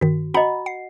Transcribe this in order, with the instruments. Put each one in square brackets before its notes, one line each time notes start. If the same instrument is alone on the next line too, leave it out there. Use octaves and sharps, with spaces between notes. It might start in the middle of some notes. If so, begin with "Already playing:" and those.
[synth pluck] G2 D#3 [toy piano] F#4
[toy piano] F#4 D#5 [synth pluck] F#5 A#5 B5
[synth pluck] F#5 C7